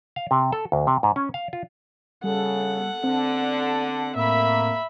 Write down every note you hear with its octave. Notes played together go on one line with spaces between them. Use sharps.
F5
C3
A4
D2
C3
G#2
C#4
F5
F4
C#3 G3 A4 F#5
D3 C4
A5
A2 A#3 E5 B5